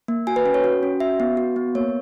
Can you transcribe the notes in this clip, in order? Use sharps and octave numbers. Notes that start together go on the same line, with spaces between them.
A#3
F#4 G#5
B4
C#4
C#5
F#4
C#4
F#4 E5
B3
F#4
B3
A#3 C#5